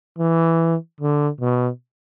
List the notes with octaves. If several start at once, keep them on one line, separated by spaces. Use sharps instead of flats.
E3
D3
B2